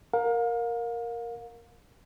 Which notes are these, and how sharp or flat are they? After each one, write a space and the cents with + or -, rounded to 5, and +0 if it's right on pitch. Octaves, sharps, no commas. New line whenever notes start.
A#4 +0 F5 +35